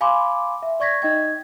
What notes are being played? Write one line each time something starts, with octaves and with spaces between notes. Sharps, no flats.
F5 G#5 B5 C6 D6
E5
D5 C#6 G#6 A#6 B6
D#4 D#5 G5 G#6